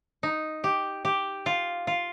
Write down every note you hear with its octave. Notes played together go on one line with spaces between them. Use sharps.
D#4
G4
G4
F4
F4